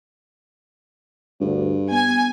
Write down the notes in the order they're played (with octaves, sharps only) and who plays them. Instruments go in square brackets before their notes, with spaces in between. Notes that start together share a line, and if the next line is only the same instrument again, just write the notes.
[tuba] D2 [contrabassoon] G2
[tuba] B3 [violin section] G#5